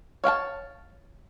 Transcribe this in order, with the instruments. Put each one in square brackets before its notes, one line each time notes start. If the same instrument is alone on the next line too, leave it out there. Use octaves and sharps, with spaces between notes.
[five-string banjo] C#5 F5 G5 A5